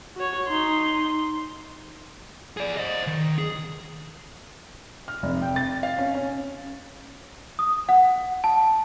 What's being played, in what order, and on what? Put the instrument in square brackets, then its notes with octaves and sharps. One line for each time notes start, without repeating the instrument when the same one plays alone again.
[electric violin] F#4 C#5
D#4 C6
[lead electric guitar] G#4 D5
C5 D#5
D#3
G#4
[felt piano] F6
F1
G5
A6
F5
C#4
C#4
[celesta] D#6
F#5
A5